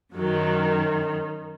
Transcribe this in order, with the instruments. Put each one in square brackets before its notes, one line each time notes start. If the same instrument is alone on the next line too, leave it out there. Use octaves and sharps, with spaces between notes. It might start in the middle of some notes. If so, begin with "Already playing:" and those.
[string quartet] F#2 D#3 F#3